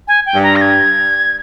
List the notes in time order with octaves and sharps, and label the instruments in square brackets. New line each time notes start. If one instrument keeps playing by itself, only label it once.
[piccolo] G#5
G5
[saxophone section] G2
[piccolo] A#5
A#6
G#6